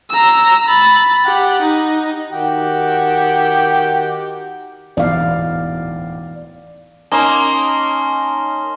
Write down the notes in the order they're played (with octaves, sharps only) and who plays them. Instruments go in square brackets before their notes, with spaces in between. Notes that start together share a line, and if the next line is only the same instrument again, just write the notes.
[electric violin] A#5 E6
B5 A6
G4 F#5
D#4
[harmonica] D#3 F#4 G4
[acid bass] D1 [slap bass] E2 G#2 B2 [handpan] D5 F5
[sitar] A#3 [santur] C#4 D#4 [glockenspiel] A5 C6 G7